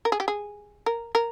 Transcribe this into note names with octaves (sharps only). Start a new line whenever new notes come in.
A#4
G#4
G4
G#4
A#4
A#4